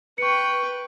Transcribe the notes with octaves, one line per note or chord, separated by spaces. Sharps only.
B4 G5 C#6 C#7